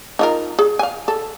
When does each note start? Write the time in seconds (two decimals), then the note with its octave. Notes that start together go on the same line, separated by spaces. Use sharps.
0.19 D#4 F4 A#4
0.59 G#4
0.79 F5 G#5
1.08 A4